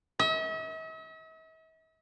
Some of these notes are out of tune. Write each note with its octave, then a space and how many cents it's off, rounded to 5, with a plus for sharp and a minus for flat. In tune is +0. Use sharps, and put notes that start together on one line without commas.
E5 -45